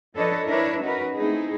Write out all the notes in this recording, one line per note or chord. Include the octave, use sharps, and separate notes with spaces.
F3 D4 A4 B4 C#5 D#5
D4 E4 A#4 B4 C#5 E5
C#4 D#4 F#4 A#4 B4
A3 C4 D#4 E4 G#4